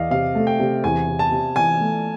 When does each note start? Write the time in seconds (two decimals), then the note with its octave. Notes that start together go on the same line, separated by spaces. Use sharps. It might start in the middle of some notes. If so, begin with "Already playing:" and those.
Already playing: E2 D5 D#5 F5
0.11 C3 F5
0.35 A3
0.47 G5
0.59 C3
0.84 E2 G#5
1.08 C3
1.19 A5
1.31 C3
1.56 E3 G#5
1.80 A3